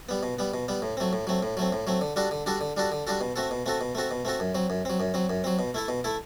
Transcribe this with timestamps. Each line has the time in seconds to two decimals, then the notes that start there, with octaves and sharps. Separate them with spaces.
0.09 G3 B3
0.23 B2
0.39 G3 B3
0.54 B2
0.68 G3 B3
0.82 A2
0.97 F#3 A3 C4
1.13 A2
1.27 F#3 A3 C4
1.43 A2
1.57 F#3 A3 C4
1.72 A2
1.87 F#3 A3 C4
2.01 D3
2.16 G3 D4 F#4 A4
2.31 D3
2.46 G3 D4 F#4 A4
2.61 D3
2.77 G3 D4 F#4 A4
2.92 D3
3.07 G3 D4 F#4 A4
3.21 B2
3.36 A3 C4 F#4 A4
3.51 B2
3.66 A3 C4 F#4 A4
3.81 B2
3.95 A3 C4 F#4 A4
4.11 B2
4.25 A3 C4 F#4 A4
4.40 F#2
4.55 F#3 C4
4.70 F#2
4.85 F#3 C4
5.00 F#2
5.14 F#3 C4
5.30 F#2
5.44 F#3 C4
5.59 B2
5.74 A3 E4 A4
5.88 B2
6.04 A3 E4 A4